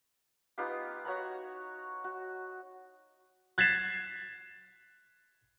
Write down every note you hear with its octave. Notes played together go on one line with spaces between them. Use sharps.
B3 D#4 F4 G4
F#4 C#5 A#5 B5
F#4
F#6 G#6 A6 B6 C7 E7